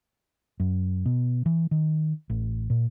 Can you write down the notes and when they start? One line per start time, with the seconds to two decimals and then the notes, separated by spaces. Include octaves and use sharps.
0.60 F#2
1.06 B2
1.46 E3
1.71 D#3
2.30 A1
2.70 A#2